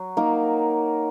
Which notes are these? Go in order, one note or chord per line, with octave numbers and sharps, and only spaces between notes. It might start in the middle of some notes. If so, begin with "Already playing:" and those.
Already playing: F#3
A#3 D#4 A#4